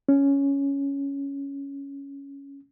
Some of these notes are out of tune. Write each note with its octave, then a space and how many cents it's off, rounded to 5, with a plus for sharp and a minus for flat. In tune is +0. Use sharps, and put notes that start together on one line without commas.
C#4 +5